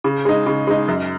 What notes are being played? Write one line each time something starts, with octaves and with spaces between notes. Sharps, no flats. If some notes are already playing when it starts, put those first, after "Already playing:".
C#3
G#3 D#4
C#3
G#3 D#4
F#2